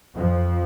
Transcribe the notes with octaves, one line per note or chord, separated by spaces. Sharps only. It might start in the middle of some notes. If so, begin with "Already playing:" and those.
F2 F3